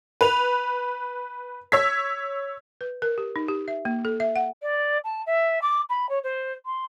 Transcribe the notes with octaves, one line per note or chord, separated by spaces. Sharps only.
B4 F7
C#5 E6 G#6 B6
B4
A#4
G4
D#4
G4
E5
A#3
A4
E5
F#5
D5
A5
E5
D6
B5
C#5
C5
C6